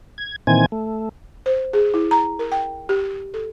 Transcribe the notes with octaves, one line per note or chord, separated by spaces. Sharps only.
G#6
A#2 D#3 E3 C4 G#5 G#6
A3
C5
G#4
E4
A#5
A#4
G5
G4
A4